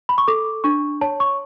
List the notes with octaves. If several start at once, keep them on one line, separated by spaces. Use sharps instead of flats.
B5
C#6
A4 D6
D4 C#6
C#5 A5
C#6